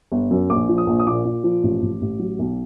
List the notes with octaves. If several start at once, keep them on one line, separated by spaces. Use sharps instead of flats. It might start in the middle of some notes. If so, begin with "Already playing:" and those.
G1
F#2
A#1 D6
F3
D#6
A#1
D#6
A#2 D6
A#2
F3
A1
A1
A1
F#3
B1